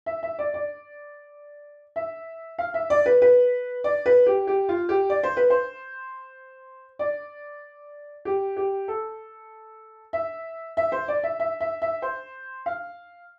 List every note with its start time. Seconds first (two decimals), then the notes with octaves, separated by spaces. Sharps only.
0.06 E5
0.23 E5
0.39 D5
0.54 D5
1.96 E5
2.59 F5
2.74 E5
2.90 D5
3.06 B4
3.22 B4
3.84 D5
4.06 B4
4.26 G4
4.47 G4
4.69 F4
4.89 G4
5.10 D5
5.23 C5
5.37 B4
5.50 C5
6.99 D5
8.25 G4
8.57 G4
8.88 A4
10.13 E5
10.77 E5
10.92 C5
11.08 D5
11.24 E5
11.40 E5
11.61 E5
11.82 E5
12.02 C5
12.66 F5